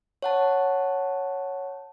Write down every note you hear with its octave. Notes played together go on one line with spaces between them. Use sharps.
C#5 F#5 A5